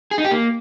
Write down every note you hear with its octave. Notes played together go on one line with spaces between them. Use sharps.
G#4
D#4
G4
A#3